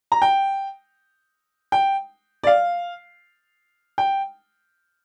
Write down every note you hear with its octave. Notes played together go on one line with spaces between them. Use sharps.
A#5
G5
G5
D5
F5
G5